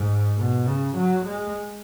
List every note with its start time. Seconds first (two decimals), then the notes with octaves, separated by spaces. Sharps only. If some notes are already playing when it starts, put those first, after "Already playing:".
Already playing: G#2
0.37 B2
0.66 C#3
0.96 F#3
1.25 G#3